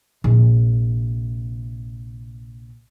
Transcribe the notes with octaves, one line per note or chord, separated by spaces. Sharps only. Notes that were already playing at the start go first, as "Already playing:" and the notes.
A#1 C3